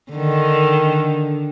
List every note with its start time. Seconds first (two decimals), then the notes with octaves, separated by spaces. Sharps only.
0.12 D3 D#3